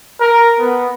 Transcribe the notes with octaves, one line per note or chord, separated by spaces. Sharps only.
A#4
B3